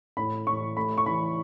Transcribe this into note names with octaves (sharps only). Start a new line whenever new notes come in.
A2 B5
A2 C#6
A3 B5
C#6
E3 B5